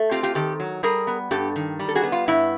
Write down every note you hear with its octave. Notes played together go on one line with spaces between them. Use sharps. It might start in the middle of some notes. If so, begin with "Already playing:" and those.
Already playing: A3
C4 F4 G4
F4 G4
D#3 G4 A4
F#3
G3 G#4 A#4
B3
G2 G4 A4
D#3
G3
A4
F#4 G#4
B3
F4
G2 E4